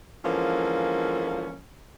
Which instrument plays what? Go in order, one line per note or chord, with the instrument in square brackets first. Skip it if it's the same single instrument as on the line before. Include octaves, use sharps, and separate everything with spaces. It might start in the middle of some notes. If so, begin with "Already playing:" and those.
[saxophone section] D3 E3 F3 G#3 A#3 C#4